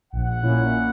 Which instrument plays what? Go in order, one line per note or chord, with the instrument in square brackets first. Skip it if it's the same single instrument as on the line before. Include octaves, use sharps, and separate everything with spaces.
[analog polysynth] A#1 [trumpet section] F#5
[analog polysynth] A#2 A#3 C#4 E4